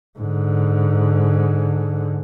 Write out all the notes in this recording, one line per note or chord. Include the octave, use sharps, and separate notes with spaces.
G#2 D3